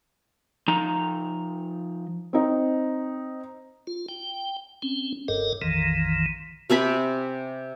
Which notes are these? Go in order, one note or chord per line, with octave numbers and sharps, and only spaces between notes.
F3 D#4 A#5
C4 D#4
F4
G5
C4 C#4
F#1 G2 A4 A#4 D#5
A#1 F2 D#3 E3
C3 C4 G#5 B5